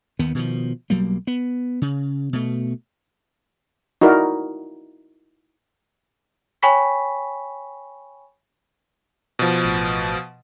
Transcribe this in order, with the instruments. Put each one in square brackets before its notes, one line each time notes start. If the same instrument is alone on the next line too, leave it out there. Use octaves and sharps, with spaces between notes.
[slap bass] D#2 D#3 B3
B2 D#3 F3
B1 F#3 G3 A#3
B3
C#3
B2 A3
[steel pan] D#4 E4 F#4 A#4 D5
[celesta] C#5 G5 G#5 B5 C#6 B6
[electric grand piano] B2 F3
[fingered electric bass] A1